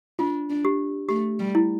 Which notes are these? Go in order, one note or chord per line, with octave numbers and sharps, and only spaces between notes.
D4 F4
D4
G4
A3 G4
G3
E4